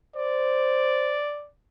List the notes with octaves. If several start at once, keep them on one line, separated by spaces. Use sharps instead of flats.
C5 D5